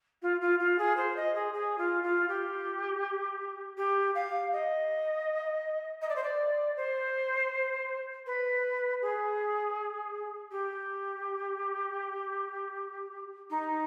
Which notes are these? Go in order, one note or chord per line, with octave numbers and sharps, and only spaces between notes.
F4
F4
F4
G#4
C5
D#5
G#4
G#4
F4
F4
G4
G4
F5
D#5
D#5
D5
C5
D5
C5
B4
G#4
G4
D#4